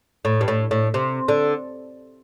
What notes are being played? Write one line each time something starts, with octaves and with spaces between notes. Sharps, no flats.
A2
G2
A2
A2
C3
D3